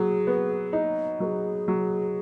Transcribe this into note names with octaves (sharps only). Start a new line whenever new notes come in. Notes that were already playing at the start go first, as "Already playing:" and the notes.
Already playing: F#3 G#4
B3
D#4
F#3 A#4
G#4
F#3